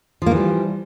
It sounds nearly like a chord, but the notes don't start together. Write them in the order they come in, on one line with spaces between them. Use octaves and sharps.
F3 A#3 E3 G3